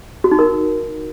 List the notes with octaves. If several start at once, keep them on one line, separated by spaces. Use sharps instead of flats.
F#4
D#4
A#4